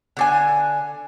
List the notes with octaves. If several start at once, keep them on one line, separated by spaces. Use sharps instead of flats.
D3 D4 G#5